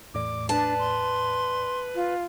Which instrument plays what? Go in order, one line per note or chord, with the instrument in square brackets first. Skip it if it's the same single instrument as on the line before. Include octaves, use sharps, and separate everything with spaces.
[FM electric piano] E2 A2 D5 [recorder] D6
[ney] D4 [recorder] B4 [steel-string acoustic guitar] A5
[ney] C6
F4